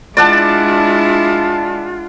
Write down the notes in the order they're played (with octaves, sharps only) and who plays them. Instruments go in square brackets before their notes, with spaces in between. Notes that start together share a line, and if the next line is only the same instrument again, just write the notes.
[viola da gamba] G#3 D4 E4 [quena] F4 [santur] D5 F#5 A5